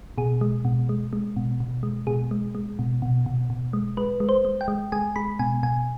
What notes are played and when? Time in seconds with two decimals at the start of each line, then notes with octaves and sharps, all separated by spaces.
0.18 B2 G#4
0.41 G#3
0.65 B2
0.89 G#3
1.13 G#3
1.36 B2
1.60 B2
1.83 G#3
2.07 B2 G#4
2.31 G#3
2.55 G#3
2.79 B2
3.02 B2
3.26 B2
3.50 B2
3.73 G#3
3.97 G#3 B4
4.20 G#3
4.29 C5
4.45 G#3
4.61 G5
4.68 G#3
4.92 G#3 G#5
5.16 G#3 B5
5.39 B2 G#5
5.63 B2 G#5